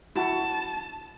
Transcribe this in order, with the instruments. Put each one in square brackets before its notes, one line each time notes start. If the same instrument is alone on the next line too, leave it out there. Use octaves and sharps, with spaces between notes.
[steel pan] E4 F#4 [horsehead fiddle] A5